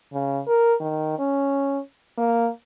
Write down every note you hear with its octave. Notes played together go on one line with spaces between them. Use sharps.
C#3
A#4
D#3
C#4
A#3